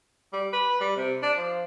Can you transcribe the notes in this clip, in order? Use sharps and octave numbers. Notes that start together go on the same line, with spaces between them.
G3
B4
G3
C3
D4
F3